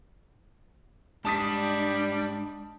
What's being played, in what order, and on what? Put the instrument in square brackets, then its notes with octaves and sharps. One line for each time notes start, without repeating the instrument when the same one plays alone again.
[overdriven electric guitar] G#2 [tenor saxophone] G3 [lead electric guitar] D4 [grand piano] A5 D#6 B6